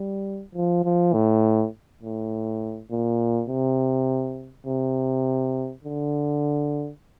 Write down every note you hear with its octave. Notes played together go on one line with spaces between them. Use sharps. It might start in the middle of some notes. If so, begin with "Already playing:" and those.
Already playing: G3
F3
F3
A2
A2
A#2
C3
C3
D3